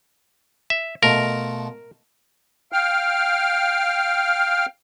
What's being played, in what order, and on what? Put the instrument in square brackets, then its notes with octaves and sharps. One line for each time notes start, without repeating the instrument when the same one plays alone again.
[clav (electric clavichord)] E5
[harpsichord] B2 A3 F4 [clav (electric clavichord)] A#4
[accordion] F5 G5 F6